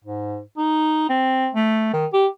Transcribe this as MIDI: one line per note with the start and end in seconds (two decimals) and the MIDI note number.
0.04 0.41 44
0.57 1.09 63
1.09 1.49 60
1.55 1.90 57
1.93 2.06 51
2.13 2.27 67